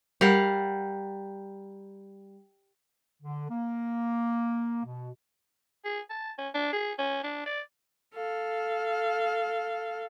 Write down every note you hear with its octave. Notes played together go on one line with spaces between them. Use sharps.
G3 A#4 F5 F#5
D3
A#3
B2
G#4
A5
C#4
D4
G#4
C#4
D4
D5
A4 F5